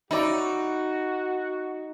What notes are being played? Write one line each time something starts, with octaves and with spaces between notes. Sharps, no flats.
D#4 E4 F#4 C#5 D5